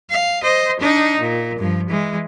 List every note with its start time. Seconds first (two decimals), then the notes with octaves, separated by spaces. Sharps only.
0.10 F5
0.43 C5 D#5
0.80 D4 D#4
1.20 A#2
1.59 G2 F3
1.89 E3 G#3